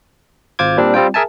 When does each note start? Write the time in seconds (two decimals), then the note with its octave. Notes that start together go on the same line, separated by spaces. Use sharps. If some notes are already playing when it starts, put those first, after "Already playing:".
0.59 G#1 F4 C5 D6 G#6
0.77 A#2 G3 C4 D4
0.94 G3 C4 F4 G5
1.14 G#4 A#4 E5 G#5 A5